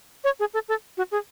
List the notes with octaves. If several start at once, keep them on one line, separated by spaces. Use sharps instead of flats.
C#5
G#4
A4
A4
F#4
G#4